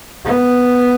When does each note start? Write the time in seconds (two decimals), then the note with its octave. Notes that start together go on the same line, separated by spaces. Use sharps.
0.25 B3